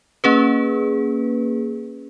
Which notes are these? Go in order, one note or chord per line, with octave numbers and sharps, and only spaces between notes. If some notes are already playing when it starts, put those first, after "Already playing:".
A#3 C#4 G#4 B4